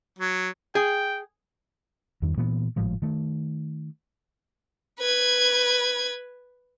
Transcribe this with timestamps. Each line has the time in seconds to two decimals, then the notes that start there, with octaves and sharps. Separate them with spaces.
0.19 F#3
0.75 G#4 G5
2.22 E2 G2 D#3
2.37 A#2 E3 A#3 B3
2.76 G#1 A2 F3 G#3
3.02 D#3 A3
5.00 B4 G#6